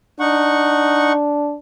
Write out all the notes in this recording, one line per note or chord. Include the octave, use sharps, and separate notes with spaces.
D4 D#4 F#5 C#6